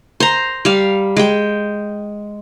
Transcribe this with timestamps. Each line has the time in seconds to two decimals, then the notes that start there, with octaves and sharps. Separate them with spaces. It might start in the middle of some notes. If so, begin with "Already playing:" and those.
0.20 C5 A#5
0.65 G3 F5
1.16 G#3 G5